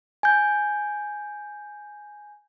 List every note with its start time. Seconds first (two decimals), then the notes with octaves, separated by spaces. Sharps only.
0.23 G#5 G6